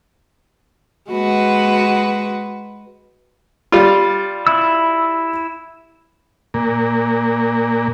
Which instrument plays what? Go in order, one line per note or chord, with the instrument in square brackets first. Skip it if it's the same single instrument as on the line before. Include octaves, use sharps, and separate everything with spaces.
[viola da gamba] G#3 F#4 B4
[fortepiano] G3 F4
[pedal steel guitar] E4 E6
[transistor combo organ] A#2